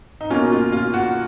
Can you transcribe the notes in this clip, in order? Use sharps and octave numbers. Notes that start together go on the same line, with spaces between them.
D#4
B2 A#3 C#4 F4
F4
F4
F#4